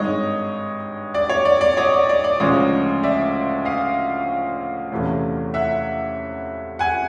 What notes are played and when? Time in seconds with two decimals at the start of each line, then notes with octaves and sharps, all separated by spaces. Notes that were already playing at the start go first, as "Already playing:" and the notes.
Already playing: G#1 G2 D#3 G#3 C#5 D#5
1.14 D5
1.30 C#5
1.45 D5
1.61 D5
1.77 C#5 D#5
1.93 D5
2.09 D5
2.24 D5
2.40 D2 C#3 F3 G#3 C#5 D#5
3.03 D5 E5
3.65 D#5 F5
4.92 E2 C3 E3 A3 C#4
5.54 E5 F#5
6.79 F#5 G#5